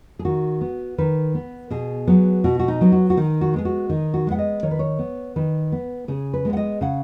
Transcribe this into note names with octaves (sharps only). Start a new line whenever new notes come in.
G#4
D#3 F#4
B3
D#3 B4
B3
B2 G#4
F#3 B3
B2 F#4
F#4
D#4
F#3 B3
F#4
F#4
D#3 D#4
F#4
G#3 B3 G#4
F#4
D#3 D#4
F#4
G#3 B3 F#5
D#5
D#3 C#5
B4
C#5
B3
D#3 B4
B3
C#3 G#4
B4
G#3 B3
F#5
D#5
C#3 F#5